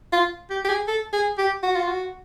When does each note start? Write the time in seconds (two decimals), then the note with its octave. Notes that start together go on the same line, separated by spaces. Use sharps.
0.12 F4
0.50 G4
0.65 G4
0.69 G#4
0.88 A4
1.13 G#4
1.38 G4
1.63 F#4
1.75 F4
1.87 F#4